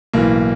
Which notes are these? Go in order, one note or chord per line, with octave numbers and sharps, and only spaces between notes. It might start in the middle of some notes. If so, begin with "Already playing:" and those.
B1 A2 E3 A#3